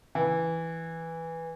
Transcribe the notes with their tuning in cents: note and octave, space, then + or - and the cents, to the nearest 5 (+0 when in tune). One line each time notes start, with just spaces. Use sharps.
E3 +0